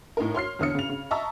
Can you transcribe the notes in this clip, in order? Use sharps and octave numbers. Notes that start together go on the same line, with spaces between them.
A2 D#4 A#4
C#5 C6 F6 C7
E2 D3 C#5 D#6 F6 C#7
C#3 F7
C#3
D#5 E5 A5 A#5 C#6 E6